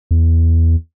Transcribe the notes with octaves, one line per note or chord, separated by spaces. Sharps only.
E2